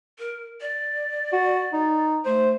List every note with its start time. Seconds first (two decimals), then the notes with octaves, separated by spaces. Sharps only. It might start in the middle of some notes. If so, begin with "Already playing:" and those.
0.19 A#4
0.61 D5
1.33 F#4
1.73 D#4
2.25 A3 C5